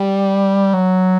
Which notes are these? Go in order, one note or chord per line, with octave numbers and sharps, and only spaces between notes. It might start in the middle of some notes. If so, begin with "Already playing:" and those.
Already playing: G3
F#3